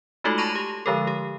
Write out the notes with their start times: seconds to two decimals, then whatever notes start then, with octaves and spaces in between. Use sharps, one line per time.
0.24 G#3 A3 D#4 F4 F#4 A4
0.38 A5 B5 C#6 A#6 D#7 F7
0.55 G4
0.86 D3 F3 G#3 G4 A4
1.07 G4